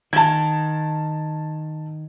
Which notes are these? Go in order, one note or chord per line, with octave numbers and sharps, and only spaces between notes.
D#3 A5 G#6